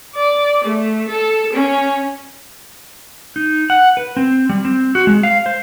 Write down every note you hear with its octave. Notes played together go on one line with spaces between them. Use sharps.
D5
A3
A4
C#4
D#4
F#5
B4
C4
G3
C4
F#4
G#3
F5
C5